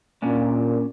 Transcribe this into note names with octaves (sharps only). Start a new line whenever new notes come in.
A#2 A#3 C#4 D4